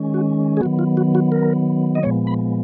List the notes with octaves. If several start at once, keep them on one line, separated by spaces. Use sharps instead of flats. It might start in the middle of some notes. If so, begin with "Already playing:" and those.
Already playing: D#3 G#3 C#4
F#4
G#4
D#3 F#3 B3 F#4
F4
F#4
F#4
A#4
D#5
A#2 F3 G#3 B3 C#5
B5